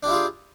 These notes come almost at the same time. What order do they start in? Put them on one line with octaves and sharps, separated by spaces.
D4 G4 E4 F4 G#4